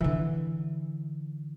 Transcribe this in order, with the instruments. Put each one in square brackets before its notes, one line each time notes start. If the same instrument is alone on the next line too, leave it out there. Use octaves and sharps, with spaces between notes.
[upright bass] D3 E3